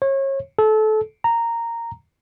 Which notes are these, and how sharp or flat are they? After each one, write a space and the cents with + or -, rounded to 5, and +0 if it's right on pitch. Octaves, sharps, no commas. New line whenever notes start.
C#5 -30
A4 -25
A#5 -10